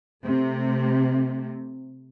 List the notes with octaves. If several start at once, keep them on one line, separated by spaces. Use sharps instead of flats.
C3 A3